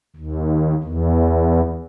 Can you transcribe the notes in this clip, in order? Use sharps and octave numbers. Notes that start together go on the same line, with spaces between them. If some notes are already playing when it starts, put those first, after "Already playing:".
D#2
E2